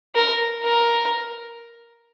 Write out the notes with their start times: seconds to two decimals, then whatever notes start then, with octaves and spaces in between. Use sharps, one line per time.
0.15 A#4
0.63 A#4